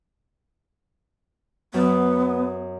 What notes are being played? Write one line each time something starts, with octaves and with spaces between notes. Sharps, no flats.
F#2 B3